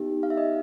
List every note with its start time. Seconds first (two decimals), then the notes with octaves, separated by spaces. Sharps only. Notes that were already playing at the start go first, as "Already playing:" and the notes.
Already playing: B3 D#4 G4
0.23 F5
0.30 E5
0.37 D#5